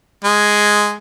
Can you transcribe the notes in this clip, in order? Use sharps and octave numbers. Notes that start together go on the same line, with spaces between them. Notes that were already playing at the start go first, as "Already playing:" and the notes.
G#3